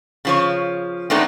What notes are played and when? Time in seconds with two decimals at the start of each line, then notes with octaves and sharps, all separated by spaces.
0.25 C#3 F3 C#5
1.10 G#3 A3 B3 C4 D4 D#4